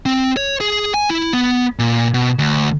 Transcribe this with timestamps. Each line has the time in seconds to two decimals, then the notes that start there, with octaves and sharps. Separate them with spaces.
0.06 C4
0.37 C#5
0.61 G#4
0.94 G#5
1.10 E4
1.33 B3
1.79 A#2
2.14 B2
2.39 D2